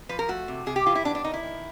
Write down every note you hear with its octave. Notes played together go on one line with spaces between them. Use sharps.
F3 B4
A#4
A3 F#4
C3
C3 G#4
G4
E3 F4
E4
B3 D4
D4
D#3 D#4
E4
D#3